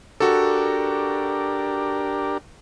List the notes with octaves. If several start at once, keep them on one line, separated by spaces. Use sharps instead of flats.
D4 F#4 G4 A4 A#4